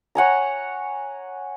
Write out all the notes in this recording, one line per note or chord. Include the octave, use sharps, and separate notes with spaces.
C#5 F#5 G#5 A#5